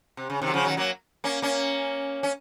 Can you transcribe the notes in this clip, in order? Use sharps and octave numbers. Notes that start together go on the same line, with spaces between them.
C3
C#3
C3 D#3
F#3
C#3 F3
D#3 F#3
F#3 A#3
A#3 C#4
A#3 C#4
C#4